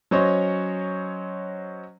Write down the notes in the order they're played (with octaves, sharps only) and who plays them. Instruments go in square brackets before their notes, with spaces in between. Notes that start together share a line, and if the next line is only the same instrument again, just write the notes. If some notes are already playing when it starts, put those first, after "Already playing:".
[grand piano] F#3 C#4 C5 C#5 D#5